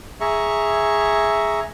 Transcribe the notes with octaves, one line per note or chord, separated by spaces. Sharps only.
G#4 E5 A#5 C#6